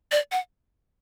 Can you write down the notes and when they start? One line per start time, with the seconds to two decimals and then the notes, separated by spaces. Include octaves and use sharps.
0.12 D5
0.32 F#5